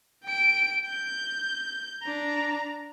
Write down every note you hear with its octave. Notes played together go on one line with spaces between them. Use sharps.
G5 D7
G6
D4 A#5